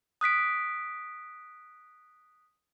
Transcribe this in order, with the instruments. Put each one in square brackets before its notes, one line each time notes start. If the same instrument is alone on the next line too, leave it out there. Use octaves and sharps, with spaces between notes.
[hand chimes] D#6 F#6 B6 D7